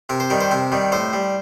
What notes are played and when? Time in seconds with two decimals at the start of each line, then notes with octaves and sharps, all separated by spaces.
0.09 C3 A#4
0.20 C5
0.30 D#3 G3 A#4
0.41 C5
0.51 C3 A#4
0.72 D#3 G3
0.92 A2 C5
1.13 G3